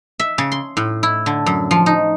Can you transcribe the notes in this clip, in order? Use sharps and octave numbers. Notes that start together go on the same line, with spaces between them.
E5
C#3
C6
A2
E4
D3
F#2
F3
D#4